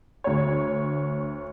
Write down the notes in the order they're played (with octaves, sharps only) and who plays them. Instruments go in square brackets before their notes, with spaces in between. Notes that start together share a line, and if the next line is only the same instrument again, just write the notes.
[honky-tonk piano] D2 C#5